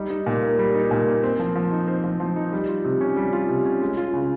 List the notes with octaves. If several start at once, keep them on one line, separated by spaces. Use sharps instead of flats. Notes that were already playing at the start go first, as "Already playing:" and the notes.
Already playing: G3 D#4
D#4
A#2
A#3
G3
D#4
A#2
A#3
C4
F3
F3
D#4
C4
F3
F3
D#4
G3
F4
C3
C#4
G3
F4
C3
C#4
G#3
F4
C#3